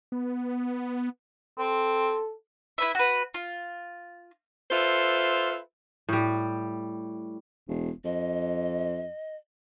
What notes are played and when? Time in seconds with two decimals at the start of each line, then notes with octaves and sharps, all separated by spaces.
0.12 B3
1.59 C4 A4
2.78 E4 B4 E5
2.95 F#4 B4
3.34 F4
4.70 F4 A4 B4 C5 E5
6.09 A2 G3
7.68 E1
8.04 F2 D#5